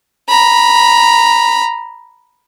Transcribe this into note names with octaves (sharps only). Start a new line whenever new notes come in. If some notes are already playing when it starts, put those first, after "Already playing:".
A#5 B5